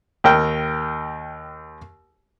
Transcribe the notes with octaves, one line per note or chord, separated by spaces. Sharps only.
D#2 A#4 G5